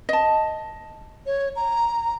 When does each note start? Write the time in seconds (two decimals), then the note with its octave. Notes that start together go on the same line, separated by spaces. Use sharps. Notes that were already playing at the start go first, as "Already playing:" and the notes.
0.09 D#5 A5
1.26 C#5
1.56 A#5